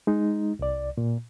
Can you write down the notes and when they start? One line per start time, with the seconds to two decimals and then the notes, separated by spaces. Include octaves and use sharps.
0.07 G#3 D#4
0.59 C2 D5
0.98 A#2